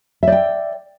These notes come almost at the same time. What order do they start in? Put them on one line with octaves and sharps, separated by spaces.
E5 D5 G5